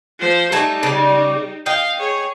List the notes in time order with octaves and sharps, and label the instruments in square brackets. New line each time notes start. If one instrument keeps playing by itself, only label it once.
[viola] F3 C5
[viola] G3 D#4 [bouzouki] A3 G#5 A5
[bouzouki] C#3 D5
[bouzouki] D#5 G5 [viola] F5
[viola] G#4 C#5